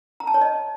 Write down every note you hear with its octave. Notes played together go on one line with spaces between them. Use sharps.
A#5
A5
C#5
D#5